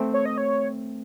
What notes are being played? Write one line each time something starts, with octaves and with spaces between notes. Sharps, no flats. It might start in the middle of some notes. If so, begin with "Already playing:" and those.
Already playing: A3 C4
C#5
D#5
C#5